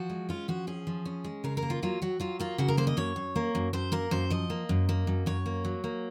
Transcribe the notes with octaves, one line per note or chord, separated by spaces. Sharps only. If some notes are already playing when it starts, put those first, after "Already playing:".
Already playing: F3 F#4
G#3
C#4 F4
F3 F#4
C#4 G#4
F3
C#4
G#3
C#3 A#4
A#4
A#3
F4
F#3 F4
F#3 F#4
F#3 F4
A#3 F4
C#3 F#4
A#4
A#3 C5
D#5
F#2 C#5
F#2
A#3
F#2
F#2 C5
A#3 A#4
F#2 C5
F3 D#5
A#3
F#2
A#3
F#2
F#2 C#5
A#3
F#3
A#3